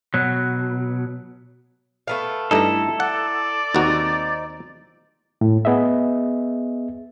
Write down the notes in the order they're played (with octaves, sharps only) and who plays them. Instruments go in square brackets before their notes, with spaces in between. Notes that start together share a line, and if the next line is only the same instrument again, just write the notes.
[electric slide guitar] B2 F#3
[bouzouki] A3 B3 F5
[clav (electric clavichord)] G2 A3 D#4 [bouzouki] E4 A#5 [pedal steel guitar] A4
[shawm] D5 [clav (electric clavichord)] F#5
[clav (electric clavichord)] D#2 F#4 [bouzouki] C4 D#4
[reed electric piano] A2
B3 G#4 D#5 E5